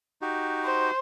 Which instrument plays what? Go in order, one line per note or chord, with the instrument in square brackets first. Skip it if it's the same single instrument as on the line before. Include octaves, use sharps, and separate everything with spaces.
[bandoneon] D#4 F#4 G4
[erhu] C5